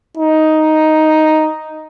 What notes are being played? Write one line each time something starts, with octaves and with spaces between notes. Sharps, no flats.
D#4